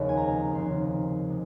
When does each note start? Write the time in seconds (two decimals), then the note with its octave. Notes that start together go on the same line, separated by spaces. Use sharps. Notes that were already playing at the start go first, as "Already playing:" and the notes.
Already playing: F1 D#2 C#3
0.09 G#5
0.17 A#5
0.54 F1 D#2 C#3 C6
1.29 C3 G#3